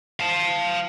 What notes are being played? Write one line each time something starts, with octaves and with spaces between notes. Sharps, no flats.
F5 A5